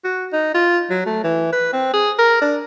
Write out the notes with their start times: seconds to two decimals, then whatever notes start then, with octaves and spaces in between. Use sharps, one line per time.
0.04 F#4
0.33 D#4
0.54 F4
0.90 F#3
1.06 A3
1.24 E3
1.52 B4
1.73 C4
1.94 G#4
2.18 A#4
2.42 D4